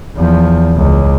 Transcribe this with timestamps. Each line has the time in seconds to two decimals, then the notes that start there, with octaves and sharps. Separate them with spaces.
0.17 E2 F3
0.76 C#2